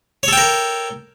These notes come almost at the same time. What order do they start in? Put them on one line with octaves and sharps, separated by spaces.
C#5 A4 G5 A#4